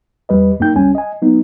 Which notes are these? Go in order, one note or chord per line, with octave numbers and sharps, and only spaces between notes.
E2 G3 B4 D#5
F#2 A#3 D4 D#4 G5 G6
C#2 G3 C#4 G#5
D#5 G#5
F#3 B3 D#4